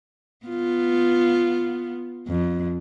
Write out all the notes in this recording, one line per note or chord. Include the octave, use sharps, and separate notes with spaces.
B3 F4
F2